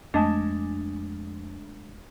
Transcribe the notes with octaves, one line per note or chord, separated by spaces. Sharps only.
F2 G#3 A3 D4 D#5 A5